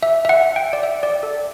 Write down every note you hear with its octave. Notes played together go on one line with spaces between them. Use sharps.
E5
E5
F#5
G5
D5
E5
D5
A4